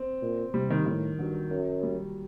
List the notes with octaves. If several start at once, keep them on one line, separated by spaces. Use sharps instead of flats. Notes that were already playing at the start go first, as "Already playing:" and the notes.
Already playing: C4
A#2
C3 G3
D#3
A2 D#3
G2 F#3
F#2
G3